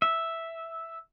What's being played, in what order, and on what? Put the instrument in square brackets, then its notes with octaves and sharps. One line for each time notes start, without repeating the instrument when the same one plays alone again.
[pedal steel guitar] E5